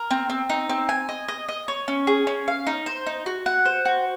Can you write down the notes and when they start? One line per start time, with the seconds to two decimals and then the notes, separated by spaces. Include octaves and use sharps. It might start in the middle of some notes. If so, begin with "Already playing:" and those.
Already playing: A#4
0.11 C4
0.30 C4
0.50 D#4
0.69 C4
0.89 G#5
1.09 D#5
1.28 D#5
1.48 D#5
1.68 C#5
1.88 C#4
2.07 G#4
2.27 C#4
2.48 F5
2.67 D#4
2.86 C5
3.06 D#4
3.26 F#4
3.46 F#5
3.65 C5
3.85 F#4